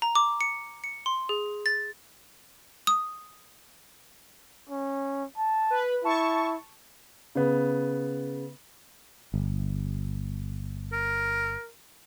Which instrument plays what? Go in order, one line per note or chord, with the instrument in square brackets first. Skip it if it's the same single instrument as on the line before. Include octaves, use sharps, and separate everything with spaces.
[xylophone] A#5
D6
C#7
C#7
C6
G#4
A6
D#6
[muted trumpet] C#4
A5
[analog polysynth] B4
[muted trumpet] E4 [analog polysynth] A5 C#6
[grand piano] C#3 B3
[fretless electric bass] G1
[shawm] A#4